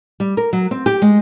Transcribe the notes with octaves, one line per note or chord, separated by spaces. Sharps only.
G3
A#4
F#3
C4
G4
G#3